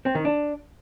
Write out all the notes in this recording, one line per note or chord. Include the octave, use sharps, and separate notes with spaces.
C4
D#3
D4